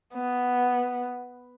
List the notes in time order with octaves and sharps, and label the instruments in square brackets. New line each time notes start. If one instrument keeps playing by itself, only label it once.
[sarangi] B3